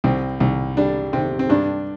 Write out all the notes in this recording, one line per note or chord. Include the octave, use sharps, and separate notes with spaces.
C2 C4
C2
G3 D4
C3 C4
C4
G2 D4